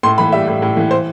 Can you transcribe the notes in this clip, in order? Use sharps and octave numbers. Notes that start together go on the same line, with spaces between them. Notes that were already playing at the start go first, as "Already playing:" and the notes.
A2 C6
E3 B5
G3 E5
A2
A2
E3
C5